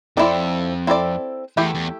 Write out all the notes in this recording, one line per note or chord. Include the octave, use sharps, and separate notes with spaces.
F2 C4 E4 A4 D5
C4 E4 A4 D5
E2 A3 E4 G4
E2